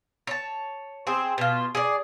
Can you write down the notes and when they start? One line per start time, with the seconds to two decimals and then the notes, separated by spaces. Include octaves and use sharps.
0.27 C#5 A5
1.07 C4 G#4
1.38 B2 F4
1.75 G#4 D5